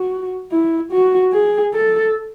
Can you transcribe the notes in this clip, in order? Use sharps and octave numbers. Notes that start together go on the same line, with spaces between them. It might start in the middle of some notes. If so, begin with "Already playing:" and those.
Already playing: F#4
E4
F#4
G#4
A4